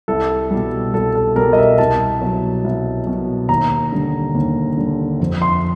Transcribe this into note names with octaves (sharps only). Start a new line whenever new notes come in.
C2 A4
B2 G3
C2 A4
A4
B2 G3 A#4
D#5
E5
C2 A5
B2 F#3
C2
B2 F#3
D#2 A#5
D3 G3
D#2
D3 G3
F2
C6